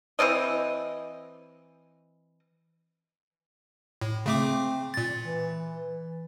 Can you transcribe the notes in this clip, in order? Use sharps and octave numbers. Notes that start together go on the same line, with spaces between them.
E3 C4 D5 D#5
A2
C#3 A3 C4 D6
A#2 A6
E3